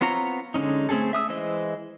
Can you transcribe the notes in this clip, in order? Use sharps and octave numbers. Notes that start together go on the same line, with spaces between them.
B3 C4 F4 C#5 A#5
D3 G#3 C#4 D#4
A3 C4 C#4 G#4 A4
E5 D#6 E6
E3 G#3 C5 D#5